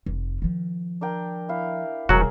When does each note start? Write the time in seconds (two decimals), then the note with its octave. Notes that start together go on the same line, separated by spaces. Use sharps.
0.06 F1
0.42 D#3 F3
1.01 D4 A#4 G5
1.49 E4 F5
2.09 E1 C3 F#3 G3 F#4 G#4 A#4 C#5